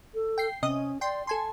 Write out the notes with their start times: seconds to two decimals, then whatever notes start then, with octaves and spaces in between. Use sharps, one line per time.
0.14 A4
0.38 G5 C7
0.63 C3 C#4 D#5 D#6
1.01 D5 G5 C6
1.27 A4 G#5 A5 C6